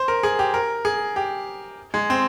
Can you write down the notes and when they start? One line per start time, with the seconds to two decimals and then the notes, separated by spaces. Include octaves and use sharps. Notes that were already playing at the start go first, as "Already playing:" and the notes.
Already playing: C5
0.08 A#4
0.23 G#4
0.39 G4
0.54 A#4
0.85 G#4
1.16 G4
1.94 G#3
2.10 C4